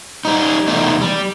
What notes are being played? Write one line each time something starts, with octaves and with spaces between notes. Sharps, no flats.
G3 D#4
E2 B2 A3 D#4
G3